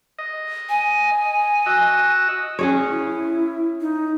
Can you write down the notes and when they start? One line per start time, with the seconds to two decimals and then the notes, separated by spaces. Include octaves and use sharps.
0.19 D#5
0.69 G#5
1.66 F#4 D#5 E6
2.59 C#4 G#4 C#5
2.91 E4
3.81 D#4